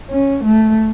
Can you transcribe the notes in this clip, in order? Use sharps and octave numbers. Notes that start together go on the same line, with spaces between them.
C#4
A3